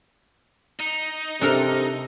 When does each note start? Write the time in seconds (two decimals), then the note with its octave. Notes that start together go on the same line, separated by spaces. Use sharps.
0.80 D#4
1.41 C3 D4 A4 A#4